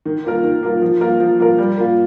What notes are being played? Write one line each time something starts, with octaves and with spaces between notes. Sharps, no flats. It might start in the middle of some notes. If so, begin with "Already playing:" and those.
D#3
A#3 F4 A#4
D#3
A#3 F4 A#4
F3
A#3 F4 A#4
F3
A#3 F4 A#4
G3
A#3 F4